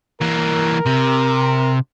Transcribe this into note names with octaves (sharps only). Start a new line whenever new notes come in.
E3 A#3 A#4
C3